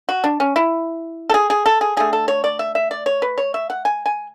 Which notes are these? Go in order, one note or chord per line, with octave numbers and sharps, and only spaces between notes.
F#4
D4
C#4
E4
A4
G#4
G#4
A4
G#4
D3 A3 G#4
A4
C#5
D5
E5
E5
D5
C#5
B4
C#5
E5
F#5
G#5
G#5